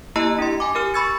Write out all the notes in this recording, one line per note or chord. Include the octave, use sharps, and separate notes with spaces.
A#3 E4 G4 D#5 A#5 E6
D4 G4 C6
G#5 D6
G4 A#4 F6
B5 C#6 E6 G#6 A6 C#7